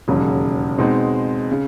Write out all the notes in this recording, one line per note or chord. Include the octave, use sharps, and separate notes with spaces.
E1 D#2 C#3 F#3
B2 G#3 C4 D#4
C#3